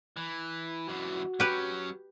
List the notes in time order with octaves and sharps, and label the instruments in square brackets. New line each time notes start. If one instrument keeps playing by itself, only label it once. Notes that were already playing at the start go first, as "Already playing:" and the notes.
[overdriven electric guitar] E3
[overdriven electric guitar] F#2 E3 [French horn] F#4
[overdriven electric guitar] F#3 C#4 [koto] G4 B4